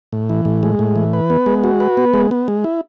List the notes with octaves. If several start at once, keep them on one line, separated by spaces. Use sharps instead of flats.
A2
E3
A2
G#3
A2
E3
B4
B3
G#3
F#4
B4
B3
G#3
B3
G#3
E4